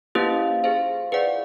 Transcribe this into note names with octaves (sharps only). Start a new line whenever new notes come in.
F3 A#3 C#4 E4 G4 B4
G#4 C5 F5
E3 G#4 B4 D5 F#5